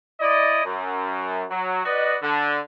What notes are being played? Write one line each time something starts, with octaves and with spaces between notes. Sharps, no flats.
E4 D5 D#5
F#2
F#3
F#4 B4 D5 D#5
D3